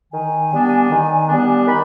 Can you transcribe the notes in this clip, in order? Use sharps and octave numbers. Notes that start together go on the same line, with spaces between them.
D#3 G#5
G3 B3 D4
D#3
G3 B3 D4
D#3 B5